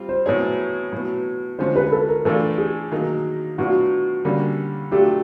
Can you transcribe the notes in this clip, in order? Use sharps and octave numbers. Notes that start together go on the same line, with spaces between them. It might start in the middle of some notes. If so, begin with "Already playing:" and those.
Already playing: G3 C4 F4
C5
A2 F#3 B3 E4 G#4 C#5
A2 F#3 B3
D3 F3 G#3 C#4 C5
B4
A4
A#4
A2 E3 A3 D4 F4 A4
G#4
D#3 F#3 A#3 D#4
A2 F#3 B3 D4 F4 F#4
D3 G3 A#3 C#4
F#3 A3 D4 F4 G4